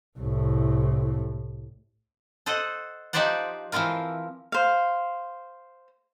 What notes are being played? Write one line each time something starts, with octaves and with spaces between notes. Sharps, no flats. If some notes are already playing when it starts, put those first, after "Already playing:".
C2 A2
A4 C5 D#5 F#5
F3 D#4 G4 C5 D5 F#5
E3 F3 C4 F4 A#4
C5 F5